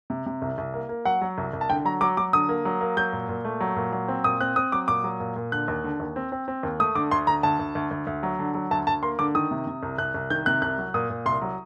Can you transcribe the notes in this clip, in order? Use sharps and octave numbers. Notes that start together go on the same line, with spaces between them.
C3
C3
C2
C2
A#3
A#3
F#3 F#5
F#3
C2
C2
A5
D3 G5
F#3 A#5
F#3 D6
F#3 D6
D3 D#6
A#3
F#3
A#3
F#3 G6
A#2
A#2
A3
F#3
A#2
F#3
C4
A#2 D#6
C4 F#6
C4 D#6
F#3 D6
A#2 D6
F#3
A#2
A#2
D3 F#6
D#2
D3
D#2
C4
C4
C4
D#2
A3 D#6
D3 D6
D2 C6
D3 A#5
D2 A5
D2
D2
D2
D2
F#3
D3
F#3
D2 A5
D2 A5
A#3 C6
D3 D6
D#3 D#6
C3
C3
C2
C2 F#6
C2
D#3 G6
C3 F#6
C2 F#6
F#3
A#2 D#6
A#2
C2 C6
F#3